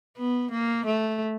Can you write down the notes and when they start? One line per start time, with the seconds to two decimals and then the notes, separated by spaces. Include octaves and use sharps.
0.17 B3
0.51 A#3
0.86 A3